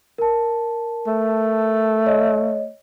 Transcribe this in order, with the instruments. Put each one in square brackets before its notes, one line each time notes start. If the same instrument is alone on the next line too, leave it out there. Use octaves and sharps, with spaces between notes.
[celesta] A#4 A5
[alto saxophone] A3
[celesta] C#5 D#5